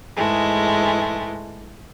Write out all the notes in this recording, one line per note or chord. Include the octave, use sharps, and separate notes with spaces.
G#2 E3 G#3 A3